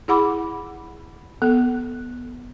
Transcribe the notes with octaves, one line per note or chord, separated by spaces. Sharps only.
E4 G#4 F#5 B5 D6
B3 A4